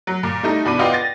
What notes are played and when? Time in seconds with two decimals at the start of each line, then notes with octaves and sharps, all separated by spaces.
0.07 F#3
0.23 A#2
0.43 G3 A3 D#4
0.65 E2 B2 D4 B5 D6 D#7
0.79 B3 F4 D5 D#5 F#5 G5
0.93 A6 A#6